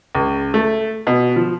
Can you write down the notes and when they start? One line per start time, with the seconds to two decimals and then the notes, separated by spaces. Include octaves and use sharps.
0.15 C#2
0.54 A3
1.07 B2
1.36 F3